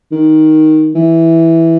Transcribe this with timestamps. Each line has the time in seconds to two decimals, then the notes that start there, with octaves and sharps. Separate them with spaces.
0.12 D#3
0.95 E3